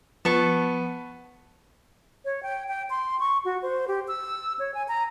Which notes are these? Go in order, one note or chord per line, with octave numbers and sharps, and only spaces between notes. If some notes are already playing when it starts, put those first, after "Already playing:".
F3 B3 A5 C#6
C#5
G5
G5
C6
C#6
F#4
C5
G4
E6
C#5
G#5
A#5